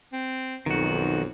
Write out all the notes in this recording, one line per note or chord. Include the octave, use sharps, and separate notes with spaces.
C4
B1 F2 D#3 F#4